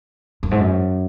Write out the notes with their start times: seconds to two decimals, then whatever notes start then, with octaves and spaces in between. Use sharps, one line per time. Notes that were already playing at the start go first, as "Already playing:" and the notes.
0.43 F#2
0.51 G#2
0.60 F#2